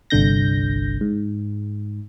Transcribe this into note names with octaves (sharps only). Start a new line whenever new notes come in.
G1 C2 D3 G6 A#6
G#2